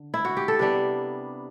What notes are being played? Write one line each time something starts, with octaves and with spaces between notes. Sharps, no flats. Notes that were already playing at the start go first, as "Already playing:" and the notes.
Already playing: D3
E4
F#4
G4
A4
C3 G3 B3 D4 B4